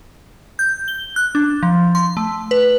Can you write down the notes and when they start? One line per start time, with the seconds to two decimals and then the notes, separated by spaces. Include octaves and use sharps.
0.59 G6
0.88 G7
1.16 F#6
1.35 D4
1.63 F3
1.95 C6
2.17 A3
2.51 B4